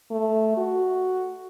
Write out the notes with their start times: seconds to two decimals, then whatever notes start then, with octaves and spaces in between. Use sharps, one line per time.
0.11 A3
0.57 F#4